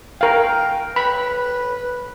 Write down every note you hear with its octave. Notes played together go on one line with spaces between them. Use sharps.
A#4 F5 G5
B4 B5